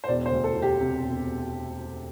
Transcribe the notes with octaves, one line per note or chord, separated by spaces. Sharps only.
C5
E1 D5
C5
D2
A4
E1
G4
C3
E1